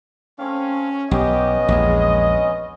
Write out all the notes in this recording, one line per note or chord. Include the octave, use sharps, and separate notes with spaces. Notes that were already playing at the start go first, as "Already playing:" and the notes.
A3 C4 C#4 F5
B1 B3 C#4 G4 D#5
A#1 E2 G#3